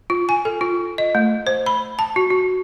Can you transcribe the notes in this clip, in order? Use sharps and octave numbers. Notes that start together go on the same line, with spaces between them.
F4
G#5
A4
F4
D#5
A3
C5
B5
A5
F#4
F#4